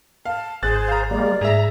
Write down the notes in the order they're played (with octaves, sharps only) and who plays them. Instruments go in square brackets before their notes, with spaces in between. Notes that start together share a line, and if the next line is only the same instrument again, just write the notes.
[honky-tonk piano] F5 [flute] A5
[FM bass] G#1 [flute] G#4 [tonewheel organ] C5 [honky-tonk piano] F#6 A6
[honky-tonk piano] F5 A#5
[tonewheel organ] G3 G#3 A#3 [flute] D5
[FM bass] G#2 [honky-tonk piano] G#4 E5 [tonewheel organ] A#5